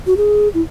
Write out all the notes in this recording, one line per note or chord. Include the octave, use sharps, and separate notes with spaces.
F#4
G#4
E4